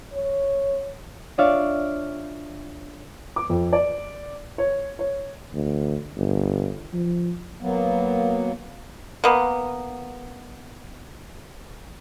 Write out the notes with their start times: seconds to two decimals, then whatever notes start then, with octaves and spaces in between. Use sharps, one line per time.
0.13 C#5
1.38 D4 F4 C#5 D5 E5 F5
3.36 D6
3.49 F2
3.73 D5
4.58 C#5
4.99 C#5
5.54 D2
6.16 G1
6.93 F3
7.61 F#3 A#3 B3
9.24 A#3 B3